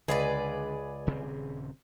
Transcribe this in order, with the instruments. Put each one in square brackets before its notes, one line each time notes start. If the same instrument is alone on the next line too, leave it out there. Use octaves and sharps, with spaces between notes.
[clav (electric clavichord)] C#2 [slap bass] D3 G#3 [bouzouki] G#4 B4 D5
[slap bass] D#1 C#3 C4